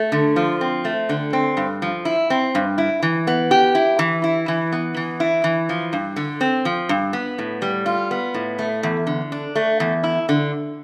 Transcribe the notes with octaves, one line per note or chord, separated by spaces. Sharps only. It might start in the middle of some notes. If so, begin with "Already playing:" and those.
Already playing: A3
D3
F3
C4
A3
D3
C4
G2
F3
E4
C4
G2
E4
E3
B3
G4
E4
E3
E4
E3
B3
E3
E4
E3
F3
G2
D3
C4
F3
G2
B3
A2
G3
F4
B3
A2
A3
E2
D3
D4
A3
E2
E4
D3